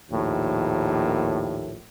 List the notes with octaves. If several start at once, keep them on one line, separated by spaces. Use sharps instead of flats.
A#1 D#2 A2